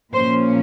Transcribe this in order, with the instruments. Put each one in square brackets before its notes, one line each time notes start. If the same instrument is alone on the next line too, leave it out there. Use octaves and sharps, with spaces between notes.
[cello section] A#2 F3 A#3 C#4 C5